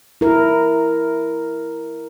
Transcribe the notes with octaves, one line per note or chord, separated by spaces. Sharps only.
E4 A#4